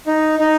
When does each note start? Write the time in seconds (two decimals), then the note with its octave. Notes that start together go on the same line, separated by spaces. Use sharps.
0.07 D#4
0.39 D#4